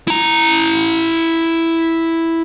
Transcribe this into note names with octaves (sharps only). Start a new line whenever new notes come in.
E4 A#5